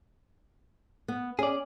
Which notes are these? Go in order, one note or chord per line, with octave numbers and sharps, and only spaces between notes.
B3
C#4 G#4 D5